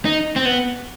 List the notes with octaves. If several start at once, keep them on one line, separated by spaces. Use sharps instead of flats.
D#4
C4
B3